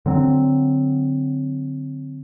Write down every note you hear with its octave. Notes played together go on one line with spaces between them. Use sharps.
D3 F#3 C4